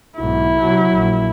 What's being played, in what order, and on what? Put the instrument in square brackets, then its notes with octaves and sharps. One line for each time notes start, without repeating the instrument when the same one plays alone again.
[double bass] B1 G#2 [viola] E4
[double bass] C3 F#3
A#1